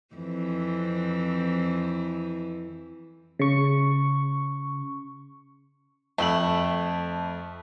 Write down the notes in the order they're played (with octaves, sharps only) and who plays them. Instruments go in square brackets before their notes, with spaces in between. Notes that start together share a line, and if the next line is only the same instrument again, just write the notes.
[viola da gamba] F2 E3 C4
[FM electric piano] C#3 C#6
[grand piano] F2 E5 F#7 [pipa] A3